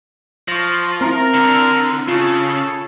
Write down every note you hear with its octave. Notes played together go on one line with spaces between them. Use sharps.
F3 C#6 A#6
C4 E4 A#4
D3
C#3 F4 G#4 A4 C#5